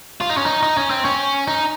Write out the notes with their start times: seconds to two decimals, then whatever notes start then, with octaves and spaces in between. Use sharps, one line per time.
0.21 F4
0.30 D#4
0.37 C#4
0.46 D#4
0.63 D#4
0.77 C#4
0.90 C4
1.05 C#4
1.48 D#4